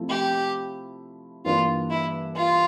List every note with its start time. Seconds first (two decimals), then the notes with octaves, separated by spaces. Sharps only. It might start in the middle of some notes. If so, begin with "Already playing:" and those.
Already playing: C3 F3 A3 E4
0.10 G4
1.45 G2 E3 G3 A#3 D4 F4
1.90 E4
2.36 F4